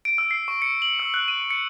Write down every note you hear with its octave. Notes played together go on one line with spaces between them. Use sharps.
D7
E6
C7
C#6
C#7
F#7
E6
F#6
D#7
C#7